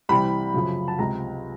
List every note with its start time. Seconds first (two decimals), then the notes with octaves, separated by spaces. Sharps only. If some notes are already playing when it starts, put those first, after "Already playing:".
0.09 C2 C3 E3 G3 B5
0.54 F#2 C#3 F3
0.88 A5
0.98 C#2 C3 F3 A#5